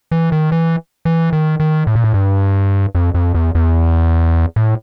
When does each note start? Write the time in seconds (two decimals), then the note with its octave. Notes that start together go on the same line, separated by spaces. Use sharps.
0.11 E3
0.32 D#3
0.52 E3
1.05 E3
1.33 D#3
1.60 D#3
1.87 A2
1.95 A#2
2.04 A2
2.14 G2
2.95 F2
3.14 F2
3.35 E2
3.55 E2
4.56 A2